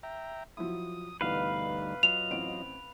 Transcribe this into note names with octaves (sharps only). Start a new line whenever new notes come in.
E5 G5 A#5
F3 F#3 E4 D#6
D2 G2 B2 E3 G3 D#4 B4 F5
F#3 F4 D#5 F7
A1 C4 D7